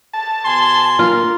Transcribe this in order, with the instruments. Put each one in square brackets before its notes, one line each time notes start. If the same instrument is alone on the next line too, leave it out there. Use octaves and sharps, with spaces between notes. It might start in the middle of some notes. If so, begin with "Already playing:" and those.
[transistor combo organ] A5
[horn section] B2 G#5 C6
[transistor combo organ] A#3 [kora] F4